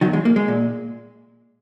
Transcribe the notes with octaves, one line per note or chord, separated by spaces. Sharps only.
E2 D#3 F#3
G#3
A#3
G#3
A#2